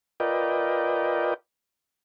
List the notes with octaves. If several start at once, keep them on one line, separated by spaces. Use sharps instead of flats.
F4 A#4 B4 D5 D#5 G5